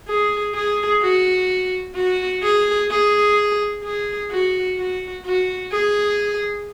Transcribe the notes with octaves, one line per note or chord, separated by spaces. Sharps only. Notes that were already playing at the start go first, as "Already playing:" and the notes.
G#4
G#4
F#4
F#4
G#4
G#4
G#4
F#4
F#4
F#4
G#4